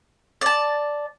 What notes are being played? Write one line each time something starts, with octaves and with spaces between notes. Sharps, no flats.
D5 A5